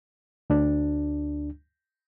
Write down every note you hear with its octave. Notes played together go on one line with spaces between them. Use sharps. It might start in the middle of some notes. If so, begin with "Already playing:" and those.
D2 D4